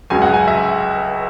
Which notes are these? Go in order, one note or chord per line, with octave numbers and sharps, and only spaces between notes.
C#2 C#3 F#3 G#5
F#5
G#5
E5